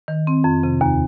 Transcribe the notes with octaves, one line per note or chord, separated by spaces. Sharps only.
D#3
C4
F2
C3
D#2